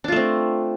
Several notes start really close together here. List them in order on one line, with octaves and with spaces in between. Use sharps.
D4 F4 A3 C4